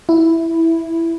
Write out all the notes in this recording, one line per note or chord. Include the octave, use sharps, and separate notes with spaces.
E4